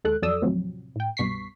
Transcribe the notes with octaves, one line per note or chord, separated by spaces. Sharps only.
D#2 G#3 A4 F#6
F2 F#3 A4 D5 D#6 E6
D#2 A2 C3 F3 F#3 C4
A2 G5
C2 G2 B2 C#6 B6 C7